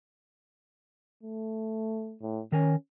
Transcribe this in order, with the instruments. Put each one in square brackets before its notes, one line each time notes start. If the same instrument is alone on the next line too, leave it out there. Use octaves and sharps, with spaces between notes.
[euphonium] A3
A2
[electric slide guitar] D#3 A#4 G#5 [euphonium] C#4